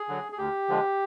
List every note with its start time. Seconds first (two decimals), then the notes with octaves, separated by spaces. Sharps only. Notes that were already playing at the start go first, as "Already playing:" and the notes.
Already playing: G#4
0.08 D3 F#3
0.32 G#4
0.38 D2 G4
0.68 D3 F3 G#3